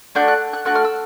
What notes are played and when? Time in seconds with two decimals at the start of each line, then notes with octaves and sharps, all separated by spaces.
0.15 A3 D4 F#4 G6
0.28 F#6
0.53 F#6
0.65 A3 D4 F#4 F#6
0.75 F6
0.84 E6